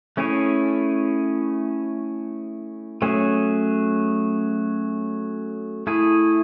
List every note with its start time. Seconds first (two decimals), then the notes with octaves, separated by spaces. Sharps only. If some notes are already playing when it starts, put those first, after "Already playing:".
0.17 A3 C#4 E4 G#4 C#5
3.02 F#3 A3 C#4 G#4
5.87 A3 E4 G#4